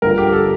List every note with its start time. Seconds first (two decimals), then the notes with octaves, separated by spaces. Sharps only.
0.02 G2 D3 F3 A#4
0.18 G4
0.33 A4